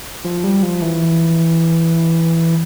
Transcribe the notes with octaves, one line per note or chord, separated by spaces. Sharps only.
F3
G3
F3
E3